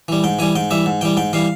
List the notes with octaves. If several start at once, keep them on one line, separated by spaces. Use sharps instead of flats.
E3 G3
G#2 G5
E3 G3 G#5
G#2 G5
E3 G3 E5
G#2
E3 G3 G5
G#2 G5
E3 G3 F5